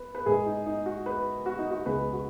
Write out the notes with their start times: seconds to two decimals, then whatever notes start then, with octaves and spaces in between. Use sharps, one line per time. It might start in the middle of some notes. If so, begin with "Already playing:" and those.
Already playing: B4
0.15 B4
0.26 G#2 G#3 G#4
0.46 D#4
0.66 D#4
0.86 F#4
1.06 B4
1.46 F#4
1.59 D#4
1.71 F#4
1.86 C#2 B2 G#3 B4
2.13 F#4